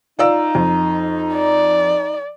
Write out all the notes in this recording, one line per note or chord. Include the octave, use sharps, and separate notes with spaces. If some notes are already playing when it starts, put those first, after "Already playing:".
D#4 F4 D5 E6
F2
D5